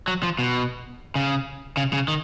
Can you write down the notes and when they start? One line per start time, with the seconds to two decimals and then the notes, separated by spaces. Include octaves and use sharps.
0.08 F#3
0.23 F3
0.39 B2
1.15 C#3
1.77 C#3
1.93 C#3
2.08 D#3